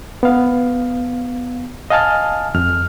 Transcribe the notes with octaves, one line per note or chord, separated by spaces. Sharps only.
B3 F5
D#5 F5 G#5 A5 F6
F2 F6